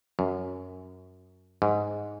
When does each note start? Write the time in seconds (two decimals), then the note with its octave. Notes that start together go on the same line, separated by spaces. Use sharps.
0.19 F#2
1.62 G#2